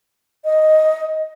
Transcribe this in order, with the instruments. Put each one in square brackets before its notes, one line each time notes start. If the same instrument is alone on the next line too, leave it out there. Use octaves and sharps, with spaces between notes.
[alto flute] D#5